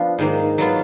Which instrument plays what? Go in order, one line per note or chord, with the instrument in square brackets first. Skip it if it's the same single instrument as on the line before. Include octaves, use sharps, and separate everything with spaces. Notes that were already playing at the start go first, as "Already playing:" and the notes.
Already playing: [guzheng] F3 B3 D4 F4
G#2 D#3 A#3
F#3 B3 F4